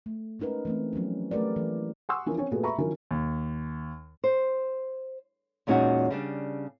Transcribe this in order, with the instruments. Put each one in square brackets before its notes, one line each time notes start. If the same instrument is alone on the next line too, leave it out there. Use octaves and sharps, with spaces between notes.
[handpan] A3
G#3 C#4 D#4 A#4 B4
E3 A3 C4
F3 F#3 B3 C#4
A3 G4 A#4 B4 D5
E3 A#3
[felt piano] F#5 G#5 C6 C#6 D#6 E6
E3 F3 C#4 A#4
C4 C#4 C#5
A#2 A3 B3 F#4 G#4 A4
E5 A#5 B5 C#6
D#3 F3 F#3 C#4 E4 A#4
[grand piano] D#2
[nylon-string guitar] C5
E2 A#2 G#3 C#4 D#4 F#4
C#3 G3 D4